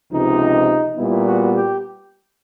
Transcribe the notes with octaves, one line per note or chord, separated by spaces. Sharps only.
C#2 C3 F3 D#4
A#2 G3 B3 E4
F#4
G4